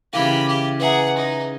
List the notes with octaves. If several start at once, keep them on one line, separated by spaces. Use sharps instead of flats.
C#3 E3 G4 A#4 F5 B5 D#7
G4
G#4 B4 E5 F#5 A#5
D#4